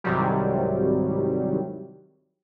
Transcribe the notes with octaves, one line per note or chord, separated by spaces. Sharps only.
C2 G#2 C3 D#3 F#3 G3